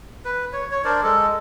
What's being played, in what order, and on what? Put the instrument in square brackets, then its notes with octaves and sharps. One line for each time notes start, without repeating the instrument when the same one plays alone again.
[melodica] B4
C#5
C#5
D4 A#4 C5 D5
G#3 A4